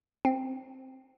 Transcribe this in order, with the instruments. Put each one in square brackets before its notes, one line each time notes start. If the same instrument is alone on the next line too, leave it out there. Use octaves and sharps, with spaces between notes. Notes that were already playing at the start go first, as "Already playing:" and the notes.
[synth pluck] C4